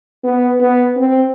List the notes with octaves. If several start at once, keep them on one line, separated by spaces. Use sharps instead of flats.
B3
B3
C4